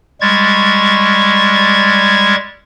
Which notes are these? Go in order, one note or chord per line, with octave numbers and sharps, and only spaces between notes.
G3 G#3 C#6 G#6 A6